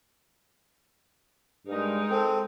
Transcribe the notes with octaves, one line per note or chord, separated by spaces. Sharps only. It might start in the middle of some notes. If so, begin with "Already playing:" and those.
G2 G#3 D#4 A#4
C4 A4